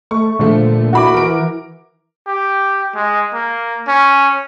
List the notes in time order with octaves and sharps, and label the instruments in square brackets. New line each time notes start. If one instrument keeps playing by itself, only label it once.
[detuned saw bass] A3 [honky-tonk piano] C#6
[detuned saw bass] A#2 [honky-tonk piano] D3 F3 A3
[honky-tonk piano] E4 B5 D6 [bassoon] F#4
[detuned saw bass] E3 [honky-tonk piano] A#4 D7
[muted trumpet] G4
G#3
A#3
C#4